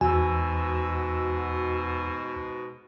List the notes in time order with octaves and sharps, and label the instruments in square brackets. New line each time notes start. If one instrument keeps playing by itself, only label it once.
[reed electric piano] E2 [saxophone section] G#2 B2 [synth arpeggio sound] F#4 E6 [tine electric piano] G#5